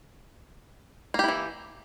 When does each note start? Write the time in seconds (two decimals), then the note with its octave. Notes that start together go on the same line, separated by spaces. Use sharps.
1.14 A#3
1.19 G4
1.24 E4
1.28 E3